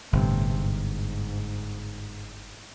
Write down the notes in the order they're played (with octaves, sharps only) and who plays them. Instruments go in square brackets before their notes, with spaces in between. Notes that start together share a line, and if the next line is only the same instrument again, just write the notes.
[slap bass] G1 [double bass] A2 C3
[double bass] G#2